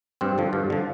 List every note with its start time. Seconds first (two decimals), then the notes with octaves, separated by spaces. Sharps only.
0.21 G2 C4
0.38 D3 F3
0.53 G2
0.70 D3 F3